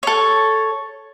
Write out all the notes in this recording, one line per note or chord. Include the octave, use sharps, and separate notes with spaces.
A4 C#5